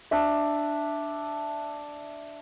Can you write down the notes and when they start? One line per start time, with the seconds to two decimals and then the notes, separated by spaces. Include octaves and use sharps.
0.11 D4 E5